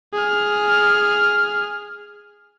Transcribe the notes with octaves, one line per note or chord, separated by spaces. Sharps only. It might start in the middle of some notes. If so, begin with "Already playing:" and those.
G#4 F6